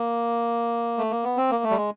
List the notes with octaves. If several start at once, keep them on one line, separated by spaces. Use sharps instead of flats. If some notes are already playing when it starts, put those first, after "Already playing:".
Already playing: A#3
A3
A#3
B3
C4
A#3
A3
G3
G#3